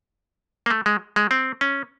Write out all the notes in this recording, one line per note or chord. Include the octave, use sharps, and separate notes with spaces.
A#3
A3
G#3
G#3
C4
C#4